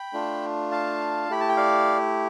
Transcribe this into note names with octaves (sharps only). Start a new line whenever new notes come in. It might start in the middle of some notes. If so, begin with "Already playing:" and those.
Already playing: G5 B5
A3 D4 F4
F5 A5
A3 E4 G4 B5
A5
G5
D5 F5